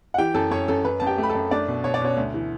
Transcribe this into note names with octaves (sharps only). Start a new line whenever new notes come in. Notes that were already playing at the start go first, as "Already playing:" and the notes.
F#5
E3 G4 G5
F#2 A4 A5
F#2 C#4 C#5
F#2 A4
F#2 B4
F#2 A5
G4 G5
A3
B5
A4 A5
F#2
A3 D4 D5
B2
B2 C#5
D5
B2 C#4 C#5
D2
E3